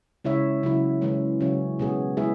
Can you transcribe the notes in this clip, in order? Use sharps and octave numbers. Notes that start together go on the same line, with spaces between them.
C#3 G#3 E4 C#5 E5
C#3 F#3 E4
C#3 E3 G#3 C#4
C#3 F#3 C#4
B2 G#3 B3 G#4
G#3 E4 G#4 B4 E5